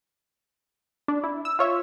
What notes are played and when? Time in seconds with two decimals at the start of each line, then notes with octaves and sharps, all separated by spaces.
1.08 D4
1.24 E4
1.45 E6
1.59 F4 C#5 E5